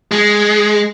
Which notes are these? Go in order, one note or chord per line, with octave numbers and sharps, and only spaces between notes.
G#3